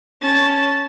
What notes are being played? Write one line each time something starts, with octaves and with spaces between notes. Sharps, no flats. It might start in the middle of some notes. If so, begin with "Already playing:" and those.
C#4 A5